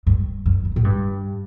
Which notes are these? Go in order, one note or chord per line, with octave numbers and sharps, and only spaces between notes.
G2
F#2
F#2
A2
G2